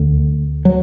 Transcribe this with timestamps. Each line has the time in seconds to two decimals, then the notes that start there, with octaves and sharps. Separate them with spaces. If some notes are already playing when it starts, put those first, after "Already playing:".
Already playing: D2 D3
0.65 F#3